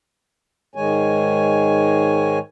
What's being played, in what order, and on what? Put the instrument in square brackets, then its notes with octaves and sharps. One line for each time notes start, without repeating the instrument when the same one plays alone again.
[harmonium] G#2 D#3 G#3 C#5 G#5